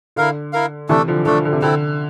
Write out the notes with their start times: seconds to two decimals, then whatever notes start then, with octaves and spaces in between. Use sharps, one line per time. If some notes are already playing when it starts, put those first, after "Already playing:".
0.16 D3 E4 A#4 F5
0.53 E4 A#4 F5
0.89 C3 E3 A3 D4 A4
1.08 D3 F3
1.25 D3 F3 A3 D4 A4
1.45 D3
1.53 C3
1.62 D3 C4 E4 A4